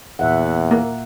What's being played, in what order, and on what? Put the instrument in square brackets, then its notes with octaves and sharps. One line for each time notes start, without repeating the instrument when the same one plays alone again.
[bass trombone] E2 [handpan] A#2 E5 F#5
[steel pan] A#3